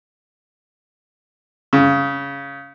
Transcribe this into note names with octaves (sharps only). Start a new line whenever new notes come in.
C#3